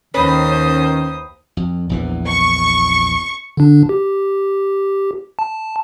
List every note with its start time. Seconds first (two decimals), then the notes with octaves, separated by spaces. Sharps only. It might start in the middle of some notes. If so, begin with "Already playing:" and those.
0.14 D#2 D#3 C#4 B4 C5 D#6
1.57 F2
1.89 A#1 E2 E3
2.27 C#6
3.57 D3 D4
3.89 G4
5.39 A5